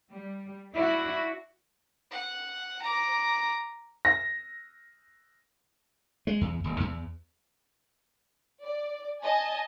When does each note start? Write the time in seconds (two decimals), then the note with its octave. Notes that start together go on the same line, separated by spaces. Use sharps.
0.12 G3
0.72 D4 E4 F#4
2.11 F#5
2.82 A#5 D6
4.05 A#6
6.27 G#3
6.41 E2
6.64 D#1
6.80 E2
8.64 D5
9.24 D#5 G#5 A5